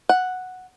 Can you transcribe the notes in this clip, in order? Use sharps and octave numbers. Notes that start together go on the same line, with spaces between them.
F#5